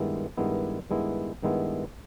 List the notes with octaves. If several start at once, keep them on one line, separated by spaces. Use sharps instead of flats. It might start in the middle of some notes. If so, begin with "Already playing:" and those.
Already playing: G2 D#3 G#3 B3 E4
G2 D#3 G#3 B3 E4
G2 D#3 G#3 B3 E4
G2 D#3 G#3 B3 E4